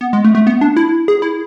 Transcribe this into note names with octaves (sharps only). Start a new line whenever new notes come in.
B3
G#3
A3
A3
B3
D4
E4
G#4
E4